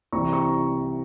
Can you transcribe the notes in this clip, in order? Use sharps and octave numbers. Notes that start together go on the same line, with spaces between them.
C2 C3 E3 G3 A#5 C#6
A#5 C#6